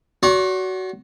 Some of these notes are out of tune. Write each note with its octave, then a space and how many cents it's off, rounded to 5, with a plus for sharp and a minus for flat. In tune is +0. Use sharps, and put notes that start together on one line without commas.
F#4 +15 D5 -45 C#6 -45